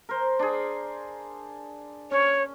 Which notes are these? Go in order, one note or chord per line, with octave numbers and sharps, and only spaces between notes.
A#4 C5
D4 G#4
C#4 C#5